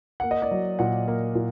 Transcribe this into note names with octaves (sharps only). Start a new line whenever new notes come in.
A#3 F#5
D#5
D5
F#3
A#2 F#5
A#3
A#2